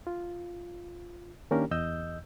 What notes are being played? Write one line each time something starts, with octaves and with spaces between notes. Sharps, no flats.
F4
D#3 A#3 C#4 D4 G4 A#4
E2 D#5 E6 G6